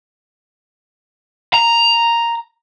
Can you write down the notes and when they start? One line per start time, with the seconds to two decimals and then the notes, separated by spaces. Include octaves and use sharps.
1.54 A#5